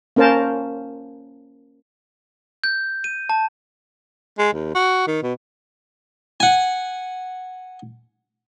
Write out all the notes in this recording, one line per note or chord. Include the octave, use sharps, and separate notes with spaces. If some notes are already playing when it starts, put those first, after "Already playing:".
A#3 C#4 A#4 C5 A5
G6
D#7
A5
G#3
D#2
F#4
D#3
B2
F#5 G#5